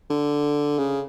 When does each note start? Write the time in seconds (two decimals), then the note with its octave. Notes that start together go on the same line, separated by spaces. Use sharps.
0.10 D3
0.78 C#3